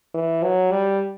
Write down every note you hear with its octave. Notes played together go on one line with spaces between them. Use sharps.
E3
F#3
G3